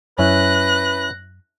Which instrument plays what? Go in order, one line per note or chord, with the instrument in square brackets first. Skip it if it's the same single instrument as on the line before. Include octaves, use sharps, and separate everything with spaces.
[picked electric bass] F#2 [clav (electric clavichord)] C#4 E4 [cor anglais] B4 [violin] F#6 A#6